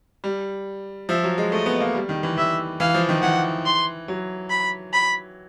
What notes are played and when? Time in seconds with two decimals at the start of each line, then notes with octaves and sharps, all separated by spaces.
0.24 G3
1.09 F3 E5
1.23 F#3
1.38 G#3
1.52 A3 D#5
1.66 B3
1.80 A#3
1.95 G3
2.09 D#3
2.23 E3
2.37 E3 E5
2.80 E3 F5
2.94 F3
3.09 D#3
3.22 E3 F#5
3.66 C6
4.08 F#3
4.50 B5
4.93 B5